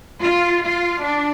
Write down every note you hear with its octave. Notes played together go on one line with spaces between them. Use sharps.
F4
F4
D4